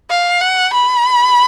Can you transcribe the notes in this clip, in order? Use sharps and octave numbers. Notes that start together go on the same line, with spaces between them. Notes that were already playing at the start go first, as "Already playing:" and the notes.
F5
F#5
B5